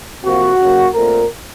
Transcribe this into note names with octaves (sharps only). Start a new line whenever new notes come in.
C3 F3 A#3 F#4
C#3 F#3 A#3
A#2 A3 C4 A#4